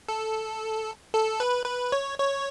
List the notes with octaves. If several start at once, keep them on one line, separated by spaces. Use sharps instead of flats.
A4
A4
B4
B4
C#5
C#5